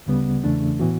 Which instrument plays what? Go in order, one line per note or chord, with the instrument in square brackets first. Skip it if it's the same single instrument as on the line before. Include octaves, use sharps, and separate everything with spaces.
[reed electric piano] D2 C#3 G3 B3
E2 C#3 E3 A3 D4
A2 E3 B3 F#4